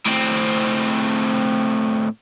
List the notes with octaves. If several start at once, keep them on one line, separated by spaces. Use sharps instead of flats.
A2 C4